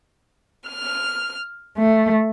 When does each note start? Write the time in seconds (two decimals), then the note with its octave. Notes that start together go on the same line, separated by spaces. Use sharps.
0.67 F6
1.78 A3